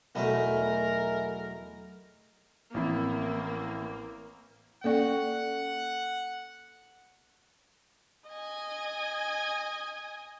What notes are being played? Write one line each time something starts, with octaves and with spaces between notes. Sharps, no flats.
B1 E2 A3 A#4 D#5 E5 G#5
A1 F3 A#3 C4 E4
A#3 C#4 A4 D5 F#5 G5 C#6
D#5 G#5